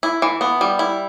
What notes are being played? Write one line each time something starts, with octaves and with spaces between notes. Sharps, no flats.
E4
E3
B3
G3
E4